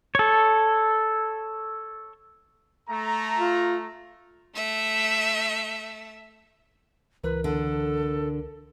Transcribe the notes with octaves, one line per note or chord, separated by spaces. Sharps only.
A4 C#5
A3 A#5
F4
A3 E5
C#2 E3 A#4 B4
D3 A4